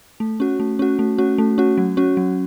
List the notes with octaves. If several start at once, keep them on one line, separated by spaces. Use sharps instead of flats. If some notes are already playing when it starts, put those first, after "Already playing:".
A3
C#4 F#4
A3
C#4 F#4
A3
C#4 F#4
A3
C#4 F#4
F#3
C#4 F#4
F#3